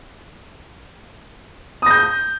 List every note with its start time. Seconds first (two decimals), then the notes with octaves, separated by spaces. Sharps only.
1.82 D#6
1.86 A#6
1.90 G6